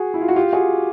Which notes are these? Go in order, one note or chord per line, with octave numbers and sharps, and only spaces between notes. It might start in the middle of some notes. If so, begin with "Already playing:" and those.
Already playing: F#4 G#4
E4
F4
F#4
F4 G4
F#4 G#4